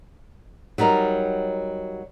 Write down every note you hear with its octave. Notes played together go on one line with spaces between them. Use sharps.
F#3 G3 D#4 A#4